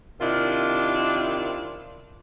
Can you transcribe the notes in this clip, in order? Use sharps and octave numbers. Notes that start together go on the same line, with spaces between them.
C3 D#3 D4 E4 F4